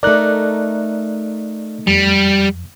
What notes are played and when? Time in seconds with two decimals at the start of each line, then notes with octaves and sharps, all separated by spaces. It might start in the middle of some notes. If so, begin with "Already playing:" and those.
0.03 A3 D#4 A#4 D5 F#6
1.87 F2 G3